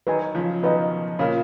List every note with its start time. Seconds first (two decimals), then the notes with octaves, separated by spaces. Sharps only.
0.07 D#3 F#3 B4 D#5 G#5
0.35 C#3 F3
0.63 B2 D#3 B4 D#5 G#5
1.19 A#2 C#3 F4 A#4 C#5 F5 B5